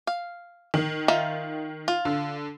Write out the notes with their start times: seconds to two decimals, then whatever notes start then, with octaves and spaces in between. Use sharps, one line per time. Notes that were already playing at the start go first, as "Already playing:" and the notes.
0.07 F5
0.74 D#3
1.08 D#4 F4 E5
1.88 F4
2.05 D3